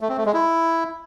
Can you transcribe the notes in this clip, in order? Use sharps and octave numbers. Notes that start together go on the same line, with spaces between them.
A3
C4
A3
G#3
E4